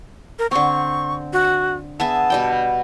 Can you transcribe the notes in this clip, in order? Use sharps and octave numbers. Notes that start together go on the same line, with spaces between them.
A#4
D3 C4 C#6
F#4
B3 G#4 E5 A5
B2 G3 G5